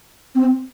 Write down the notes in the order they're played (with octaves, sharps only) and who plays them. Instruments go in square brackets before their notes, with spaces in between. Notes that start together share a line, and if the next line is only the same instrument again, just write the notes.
[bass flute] C4